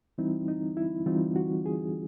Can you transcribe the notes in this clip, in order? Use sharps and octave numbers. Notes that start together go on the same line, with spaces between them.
E3 G3 C4 D#4 E4
D#4
E4
E3 G3 C4 D#4 F4
F#4
G#4